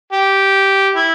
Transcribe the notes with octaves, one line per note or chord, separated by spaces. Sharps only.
G4
E4